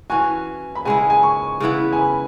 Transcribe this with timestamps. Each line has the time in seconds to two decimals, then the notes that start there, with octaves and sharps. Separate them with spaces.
0.10 E3 C#4 F#4 G#5
0.75 B5
0.85 C#3 G#3 E4 G#5
0.97 G#5
1.10 G#5
1.23 C#6
1.60 C#3 E3 B3 E4
1.93 G#5
1.99 B5